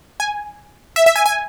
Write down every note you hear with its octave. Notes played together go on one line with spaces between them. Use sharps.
G#5
E5
E5
G#5
G#5